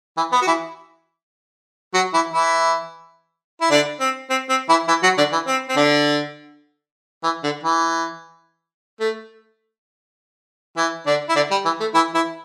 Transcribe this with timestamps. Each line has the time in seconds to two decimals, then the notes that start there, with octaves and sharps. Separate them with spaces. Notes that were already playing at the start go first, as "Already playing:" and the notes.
0.17 E3
0.32 B3
0.42 F#4
0.47 E3 E4
1.94 F#3 F#4
2.14 E3 E4
2.33 E3 E4
3.61 E4
3.71 D3 D4
4.00 C4
4.30 C4
4.49 C4
4.69 E3 E4
4.88 E3 E4
5.03 F#3 F#4
5.18 D3 D4
5.33 E3
5.47 C4
5.69 C4
5.76 D3 D4
7.24 E3
7.44 D3
7.63 E3
9.00 A3
10.77 E3 E4
11.06 D3 D4
11.29 E4
11.36 D3 D4
11.51 G3
11.65 E3
11.80 A3
11.95 E3 E4
12.15 E3 E4